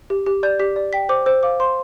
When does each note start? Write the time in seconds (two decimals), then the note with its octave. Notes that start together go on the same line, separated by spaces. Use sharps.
0.10 G4
0.26 G4
0.43 D5 G6
0.59 G4 B6
0.76 D5
0.93 G5 B6
1.09 C5 D6
1.26 C5 E6
1.43 F5 D6
1.60 C5 C6